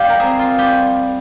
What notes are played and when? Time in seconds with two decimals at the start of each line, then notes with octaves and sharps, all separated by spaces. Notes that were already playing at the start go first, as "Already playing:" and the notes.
Already playing: G3 F4 G4
0.09 A#4
0.20 C4 G#4
0.39 F4
0.58 G3 G4